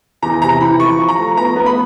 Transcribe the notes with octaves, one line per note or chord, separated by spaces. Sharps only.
E2 A#5
C3 A#5
E3 B5
F3 C#6
F3
A#5
A3
B3 A#5
B3
B5